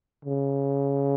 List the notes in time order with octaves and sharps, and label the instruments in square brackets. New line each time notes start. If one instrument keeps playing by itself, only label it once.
[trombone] C#3